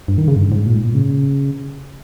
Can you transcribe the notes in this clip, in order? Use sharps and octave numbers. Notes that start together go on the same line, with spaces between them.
G2
D#3
C#3
G2
G#2
A#2
G#2
A#2
C#3